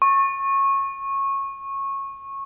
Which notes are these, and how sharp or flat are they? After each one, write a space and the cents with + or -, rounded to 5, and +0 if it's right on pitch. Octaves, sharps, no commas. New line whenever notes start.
C#6 -20